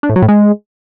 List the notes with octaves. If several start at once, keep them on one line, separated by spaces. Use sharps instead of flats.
D4
A2
F#3
A2
G#3